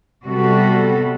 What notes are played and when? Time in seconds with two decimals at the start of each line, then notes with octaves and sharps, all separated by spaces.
0.23 C3 G3 B3 F#4 A4